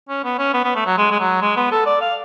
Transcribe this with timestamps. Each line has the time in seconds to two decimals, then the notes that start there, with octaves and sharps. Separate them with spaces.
0.09 C#4
0.24 B3
0.38 C#4
0.54 B3
0.64 B3
0.76 A3
0.86 F#3
0.98 G#3
1.11 G#3
1.20 F#3
1.41 G#3
1.57 B3
1.72 A4
1.86 D5
2.01 F5